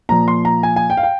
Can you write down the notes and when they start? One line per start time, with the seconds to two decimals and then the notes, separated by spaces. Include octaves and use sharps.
0.09 A#2 F3 A#5
0.28 C6
0.45 A#5
0.63 G#5
0.76 G#5
0.90 G5
0.97 F5
1.03 G5